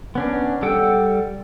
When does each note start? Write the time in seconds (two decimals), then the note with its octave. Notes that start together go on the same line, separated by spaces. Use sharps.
0.15 B3 C#4 D4
0.62 G3 A4 F#5 G5 E6